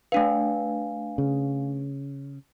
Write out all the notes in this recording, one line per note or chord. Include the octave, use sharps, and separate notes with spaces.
A3 D4 B4 F5 G#5
C#3